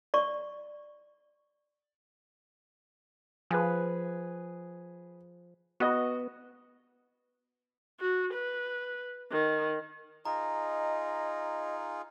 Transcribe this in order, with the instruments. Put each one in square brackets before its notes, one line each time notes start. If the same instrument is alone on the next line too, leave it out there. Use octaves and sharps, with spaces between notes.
[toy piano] D5 C#6
[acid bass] F3 [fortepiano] G#4 B4
[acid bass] B3 [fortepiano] F#4 D#5
[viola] F#4
B4
D#3
[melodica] D#4 F4 G#4 [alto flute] D#5 [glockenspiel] A#5